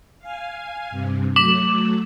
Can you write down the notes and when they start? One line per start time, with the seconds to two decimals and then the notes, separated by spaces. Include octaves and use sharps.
0.19 F5 G#5
0.90 G2 C3
1.36 F#3 A3 D6 E7 F#7